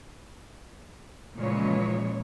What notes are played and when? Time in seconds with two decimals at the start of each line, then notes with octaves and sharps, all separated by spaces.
1.36 A#2 C#3 E3 F3 G#3 C#5